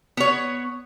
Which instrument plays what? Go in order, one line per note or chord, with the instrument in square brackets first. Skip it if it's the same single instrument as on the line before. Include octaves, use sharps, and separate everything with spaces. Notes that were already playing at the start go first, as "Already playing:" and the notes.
[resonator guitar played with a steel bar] B3 C#5